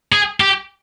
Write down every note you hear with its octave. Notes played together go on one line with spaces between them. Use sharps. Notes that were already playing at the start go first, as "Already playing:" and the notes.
G#4
G4